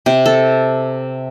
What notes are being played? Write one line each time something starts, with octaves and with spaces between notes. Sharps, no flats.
C3
A4